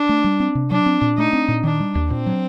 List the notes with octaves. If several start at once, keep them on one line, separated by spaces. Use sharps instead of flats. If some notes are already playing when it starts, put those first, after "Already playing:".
Already playing: D4
A3
G3
C4
C3
F#3 D4
C4
A#2
A3 D#4
C4
A#2
D#3 D4
G3
D#2
A#2 C4
F#3